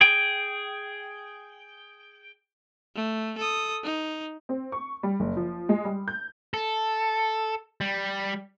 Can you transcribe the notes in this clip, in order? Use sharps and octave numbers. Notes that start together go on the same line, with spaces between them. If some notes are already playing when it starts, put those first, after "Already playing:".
G#4 G5
A3
A4 D#6
D#4
C4
C#6
G3
F#1
F3
G#3
G3
G6
A4
G3